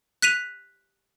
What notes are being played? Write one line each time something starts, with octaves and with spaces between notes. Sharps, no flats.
F#6 B6 D#7 F7